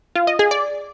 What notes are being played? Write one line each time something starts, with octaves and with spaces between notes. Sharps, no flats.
F4
D#5
G#4
D5